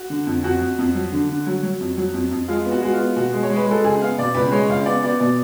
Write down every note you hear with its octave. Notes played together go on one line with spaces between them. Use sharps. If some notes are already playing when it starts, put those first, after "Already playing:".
Already playing: F#4
D3
F2
F2 F#4
F2
F2
F#3
D3
D3
F#3
F#3
F2
F#3
F2
F2
G#3 F4
B3
F#4
G#3 F#4
F4
B3
B2 F#4
G#3
C#5
G#3
B4
G#3 A4
C#2 G#4
B3 F5
B2 D5
C#2 B4
G#3 C#5
C#2 F5
B3 D5
B3 D5
B2 D5